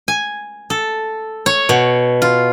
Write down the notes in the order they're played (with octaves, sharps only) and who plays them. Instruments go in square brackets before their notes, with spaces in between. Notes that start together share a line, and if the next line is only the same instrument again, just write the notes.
[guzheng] G#5
A4
C#5
B2
F4